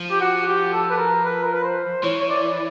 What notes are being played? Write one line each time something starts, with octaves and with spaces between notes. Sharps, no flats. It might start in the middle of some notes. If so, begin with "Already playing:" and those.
Already playing: F3
G4
F#4
G4
A4
B4
A#4
B4
A#4
B4
C5
E3 C#5
C#5
D5